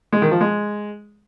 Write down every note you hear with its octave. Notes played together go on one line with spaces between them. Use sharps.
G#3
D#3
F3
G#3